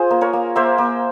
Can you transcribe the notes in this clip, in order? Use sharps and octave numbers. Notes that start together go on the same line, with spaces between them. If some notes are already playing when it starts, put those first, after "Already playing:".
Already playing: F4 G#4 C5
A#3
A#4 C#5
A#3
A#3 C5 E5
A#3